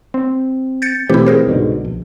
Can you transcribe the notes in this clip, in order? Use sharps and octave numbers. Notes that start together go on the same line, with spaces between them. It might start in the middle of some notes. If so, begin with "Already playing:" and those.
C4
G6 A6 C#7
B2 E3 A3 C4 E4 G4
G#4 A#4 C5
C2 G#2 B2 D3
A#1